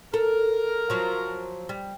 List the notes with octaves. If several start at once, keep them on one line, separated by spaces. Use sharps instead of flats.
A4 A#4
F3 F#3
G3